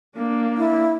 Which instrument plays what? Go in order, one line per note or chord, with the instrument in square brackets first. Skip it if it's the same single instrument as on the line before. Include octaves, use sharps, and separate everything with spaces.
[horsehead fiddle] A#3 D4
[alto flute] E4